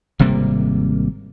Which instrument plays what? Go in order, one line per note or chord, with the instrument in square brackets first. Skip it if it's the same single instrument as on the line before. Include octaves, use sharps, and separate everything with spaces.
[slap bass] G#1 C3 G3 A#3